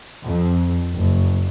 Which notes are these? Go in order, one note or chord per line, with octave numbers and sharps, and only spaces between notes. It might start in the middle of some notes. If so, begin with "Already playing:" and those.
F2
F#1